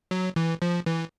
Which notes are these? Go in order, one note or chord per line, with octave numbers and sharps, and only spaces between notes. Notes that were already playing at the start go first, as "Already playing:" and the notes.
F#3
E3
F3
E3